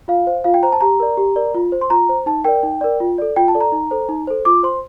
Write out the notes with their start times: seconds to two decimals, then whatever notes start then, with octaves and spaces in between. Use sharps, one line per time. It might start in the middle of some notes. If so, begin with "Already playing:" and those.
0.08 F4 F5
0.27 C5
0.44 F4 F5
0.54 G5
0.63 C5 A#5
0.72 A5
0.81 G4 A#5
1.00 A#4 D5
1.17 G4
1.36 A#4 D5
1.54 F4
1.72 C5
1.81 C6
1.90 F4 A#5
2.09 C5
2.26 D#4 A5
2.44 A#4 D5 G5
2.63 D#4
2.81 A#4 D5
3.00 F4
3.18 A4 D5
3.36 F4 G5
3.48 A5
3.55 A4 D5
3.60 A#5
3.72 D#4
3.91 A4 C5
4.09 D#4
4.27 A4 C5
4.45 F4 D6
4.63 C5 C6